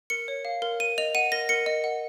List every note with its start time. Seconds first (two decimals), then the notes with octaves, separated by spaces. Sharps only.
0.10 A#4 C#7
0.28 C#5
0.45 F5
0.62 A#4
0.80 A#4 D#7
0.98 D#5 F7
1.15 F#5 D#7
1.32 A#4 A#6
1.49 A#4 C#7
1.66 D#5
1.84 F#5